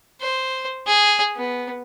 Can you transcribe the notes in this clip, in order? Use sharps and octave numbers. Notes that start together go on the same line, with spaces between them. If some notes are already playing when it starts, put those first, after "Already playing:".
C5
G#4
B3